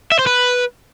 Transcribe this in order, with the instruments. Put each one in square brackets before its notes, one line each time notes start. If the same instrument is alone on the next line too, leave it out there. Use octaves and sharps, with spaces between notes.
[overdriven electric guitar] E5
C5
B4